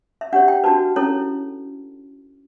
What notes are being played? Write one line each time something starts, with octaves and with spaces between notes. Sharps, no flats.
E5
D4 G4 C#5 F#5
G5
D4 F#4 B4 A5
C#4 E4 A4 C#5